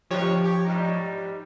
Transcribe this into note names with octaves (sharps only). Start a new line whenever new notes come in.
G#2 D3 F3 G4 C#5
G4
G#2 G3 D#4